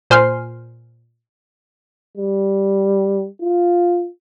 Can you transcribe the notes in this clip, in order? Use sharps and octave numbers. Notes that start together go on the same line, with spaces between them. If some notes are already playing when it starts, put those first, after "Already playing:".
A#2 C5 G#5 C6 F6 C7
G3
F4